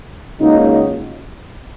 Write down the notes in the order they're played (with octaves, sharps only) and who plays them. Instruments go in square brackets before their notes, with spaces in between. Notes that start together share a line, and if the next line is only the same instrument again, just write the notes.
[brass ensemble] C#2 C#3 F#3 A#3 D#4